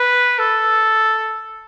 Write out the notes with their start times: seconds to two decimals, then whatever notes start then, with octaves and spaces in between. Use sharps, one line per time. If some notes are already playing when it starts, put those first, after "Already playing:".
Already playing: B4
0.39 A4